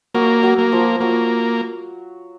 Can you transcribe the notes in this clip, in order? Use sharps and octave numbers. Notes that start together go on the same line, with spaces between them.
F#3 A#3
F#3
A#3
F3
F#3 A#3